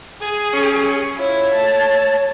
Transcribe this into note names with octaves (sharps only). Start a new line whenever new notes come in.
G#4 G#5
C#4
E4 F4 C#5
A3 A5